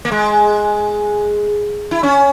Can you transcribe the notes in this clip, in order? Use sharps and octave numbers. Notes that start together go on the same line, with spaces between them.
A#3
G#3
E4
C#4